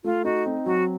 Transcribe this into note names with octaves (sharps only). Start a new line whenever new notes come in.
A3 F4
D#4 F#4
C4
F#3 F#4